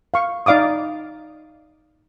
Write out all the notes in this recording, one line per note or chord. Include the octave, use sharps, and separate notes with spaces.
F5 C#6
D#4 D5 F5 D6 D#6